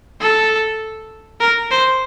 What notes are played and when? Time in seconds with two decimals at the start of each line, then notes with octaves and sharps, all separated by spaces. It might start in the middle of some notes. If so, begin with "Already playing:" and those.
0.21 A4
1.41 A#4
1.71 C5